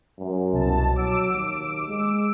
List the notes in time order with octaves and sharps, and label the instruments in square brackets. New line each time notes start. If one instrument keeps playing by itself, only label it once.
[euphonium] F#2
[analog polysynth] C2 B2 A5
[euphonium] F#3 [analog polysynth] D6 E6 D7
[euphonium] D#2
G#3